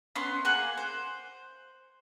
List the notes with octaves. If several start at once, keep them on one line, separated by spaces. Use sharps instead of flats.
B3 C#4 C6
A#3 G#4 F#5 G#5
C5